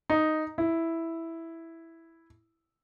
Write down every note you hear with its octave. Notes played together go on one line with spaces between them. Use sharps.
D#4
E4